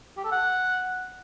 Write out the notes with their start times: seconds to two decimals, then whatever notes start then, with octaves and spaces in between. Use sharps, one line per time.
0.17 G4
0.24 A4
0.32 F#5